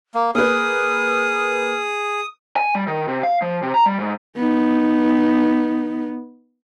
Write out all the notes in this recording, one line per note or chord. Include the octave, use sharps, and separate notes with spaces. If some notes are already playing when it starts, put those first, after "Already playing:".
A#3
A#3 G#4 B4 D#6 F6
G#5
G3
D#3
C3
F5
F3
C3
A#5
G3
G#2
B3 D#4